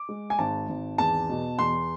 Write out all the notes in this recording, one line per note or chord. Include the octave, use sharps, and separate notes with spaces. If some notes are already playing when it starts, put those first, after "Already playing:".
Already playing: D6
G#3
G#5
G#1 A5
G#1
E2 A5
B2
E2 C6